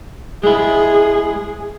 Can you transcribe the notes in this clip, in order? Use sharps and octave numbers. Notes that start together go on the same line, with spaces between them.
G#3 E4 G#4